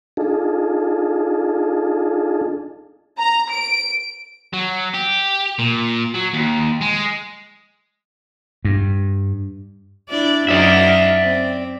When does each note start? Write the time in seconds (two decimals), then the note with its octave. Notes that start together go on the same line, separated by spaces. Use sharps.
0.17 D4 D#4 F4 G#4 A4
3.18 A#5
3.51 D7
4.54 F#3
4.94 G4
5.59 A#2
6.14 F#3
6.34 D#2
6.82 G#3
8.65 G2
10.09 D4 E4 D5
10.49 F#2 D#4 A#4 D5 E5
11.23 C4